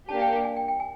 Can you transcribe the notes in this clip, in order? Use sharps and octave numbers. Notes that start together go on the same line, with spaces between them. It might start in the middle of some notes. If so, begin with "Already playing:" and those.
A#3 D4 G4 A5
G5
G5
G#5
G5
G5
G#5